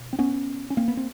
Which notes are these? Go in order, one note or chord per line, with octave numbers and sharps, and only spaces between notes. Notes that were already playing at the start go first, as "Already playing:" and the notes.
Already playing: B2
C4
B3 C#4
C#4
A#3 C4
B3
C4